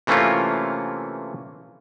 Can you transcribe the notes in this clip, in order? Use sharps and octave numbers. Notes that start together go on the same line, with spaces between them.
C3 E3 A3 A#3 C#4 F4